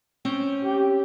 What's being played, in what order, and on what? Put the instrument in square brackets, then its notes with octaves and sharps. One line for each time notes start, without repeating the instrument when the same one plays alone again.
[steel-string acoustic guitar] C4 C#4 G5
[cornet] G4